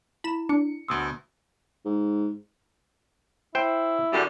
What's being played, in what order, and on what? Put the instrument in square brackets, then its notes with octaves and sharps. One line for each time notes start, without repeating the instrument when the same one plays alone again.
[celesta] E4 [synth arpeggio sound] B5 E7
[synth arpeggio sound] D4 [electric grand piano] C#7
[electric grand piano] D2 B2 C6 [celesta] D#6 E6
[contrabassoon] G#2
[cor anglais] E4 [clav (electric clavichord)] C5 G5
[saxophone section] F#2 D3 G3